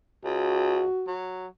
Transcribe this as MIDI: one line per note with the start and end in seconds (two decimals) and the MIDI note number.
0.25 0.86 37
0.25 1.15 66
1.07 1.47 54